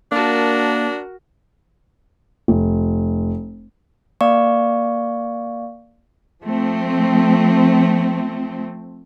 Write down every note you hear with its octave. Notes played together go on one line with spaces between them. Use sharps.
A#3 D4 F#4 A#4 A5
F1
A#3 D5 F5 C#6
F3 A3 C4